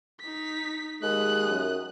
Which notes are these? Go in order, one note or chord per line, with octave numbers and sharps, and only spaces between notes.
D#4 B6
D#2 G#3 D#6 F#6
F#2